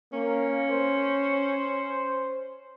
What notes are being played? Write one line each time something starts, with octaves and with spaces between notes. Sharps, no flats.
A#3 C#4
C5